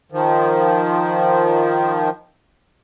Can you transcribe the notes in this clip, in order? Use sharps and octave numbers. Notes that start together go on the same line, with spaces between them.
D#3 F3